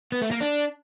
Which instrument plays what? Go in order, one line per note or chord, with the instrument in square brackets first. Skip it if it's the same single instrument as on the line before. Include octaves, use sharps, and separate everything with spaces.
[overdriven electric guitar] B3
A3
A#3
D4